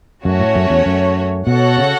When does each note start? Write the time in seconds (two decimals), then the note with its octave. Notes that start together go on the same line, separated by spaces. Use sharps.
0.25 F#2 A3 C#4 F#4 C#5
0.40 A2
0.56 F#2
0.70 E2
0.86 F#2
1.47 B2 F#4 A4 C#5 F#5
1.77 C#3